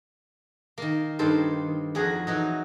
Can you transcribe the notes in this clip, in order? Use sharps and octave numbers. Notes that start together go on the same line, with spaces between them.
D#3 A#3
G2 D#3 A4 C5
F2 F#4 G#4 A#5
E3 F#3 D#4